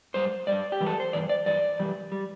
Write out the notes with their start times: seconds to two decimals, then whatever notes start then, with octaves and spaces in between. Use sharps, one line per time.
0.14 G2 G3 C5
0.47 G2 G3 D5
0.72 G4
0.80 G2 E3 G3
0.86 A4
1.00 C5
1.13 G2 E3 D5
1.29 D5
1.46 G2 E3 D5
1.79 G2 E3 G3
2.12 G3